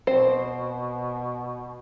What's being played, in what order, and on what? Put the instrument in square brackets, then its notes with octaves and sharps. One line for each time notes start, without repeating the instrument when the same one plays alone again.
[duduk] B2 [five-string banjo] C4 C5